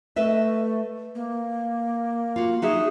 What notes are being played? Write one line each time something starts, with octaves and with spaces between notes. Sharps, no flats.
A3 B4 D#5 E5
A#3
F4 F#4
D#4 F#4 G#4 E5